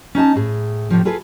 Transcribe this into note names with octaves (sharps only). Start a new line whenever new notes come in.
C#4 D#4 D#5 A5
A2 G#4
A2 C3 F3
F4 G#4 A4 B4